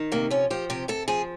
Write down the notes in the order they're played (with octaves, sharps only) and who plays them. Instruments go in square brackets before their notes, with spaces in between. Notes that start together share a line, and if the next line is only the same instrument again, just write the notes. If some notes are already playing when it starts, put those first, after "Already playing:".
Already playing: [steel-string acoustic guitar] D#3
C3 A#3
F3 C#4
F3 G4
C3 G4
C3 A4
F3 G#4